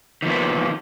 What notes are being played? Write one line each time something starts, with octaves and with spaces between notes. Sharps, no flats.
D#3 F3 A#3 B3